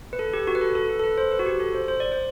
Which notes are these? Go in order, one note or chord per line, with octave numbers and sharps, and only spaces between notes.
B4
A4
G4
F#4
B4
A4
A4
B4
A4
B4
C5
B4
F#4
G4
A4
C5
C5
D5
C5